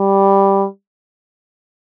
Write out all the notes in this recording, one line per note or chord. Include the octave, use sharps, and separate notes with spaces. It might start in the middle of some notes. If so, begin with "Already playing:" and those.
Already playing: G3